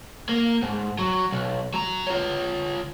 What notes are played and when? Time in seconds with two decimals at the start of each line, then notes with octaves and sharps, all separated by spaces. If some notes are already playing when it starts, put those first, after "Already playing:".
0.29 A#3
0.62 G#2
0.99 F#3
1.32 B1
1.74 F#3 A#5
2.07 F4 C#5